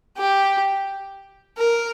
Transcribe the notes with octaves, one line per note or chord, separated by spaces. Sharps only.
G4
A#4